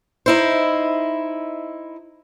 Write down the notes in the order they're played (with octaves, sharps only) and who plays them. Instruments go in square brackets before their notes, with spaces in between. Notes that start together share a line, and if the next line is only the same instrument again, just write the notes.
[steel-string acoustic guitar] D#4 E4 C5